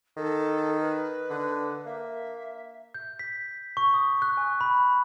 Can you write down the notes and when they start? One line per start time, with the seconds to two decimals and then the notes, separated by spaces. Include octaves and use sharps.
0.17 D#3 A4
0.81 B4
1.30 D3
1.86 A#3 E5
2.94 G6
3.19 B6
3.77 C#6
3.94 D#6
4.22 F#6
4.37 G#5
4.61 B5